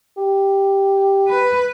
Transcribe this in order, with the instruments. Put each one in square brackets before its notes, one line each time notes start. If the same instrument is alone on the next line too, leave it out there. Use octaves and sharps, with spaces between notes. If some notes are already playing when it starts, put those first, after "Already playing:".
[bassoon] G4
[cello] B4